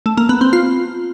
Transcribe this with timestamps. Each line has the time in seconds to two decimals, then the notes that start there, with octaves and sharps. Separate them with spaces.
0.06 A3
0.18 A#3
0.29 B3
0.41 C4
0.53 F4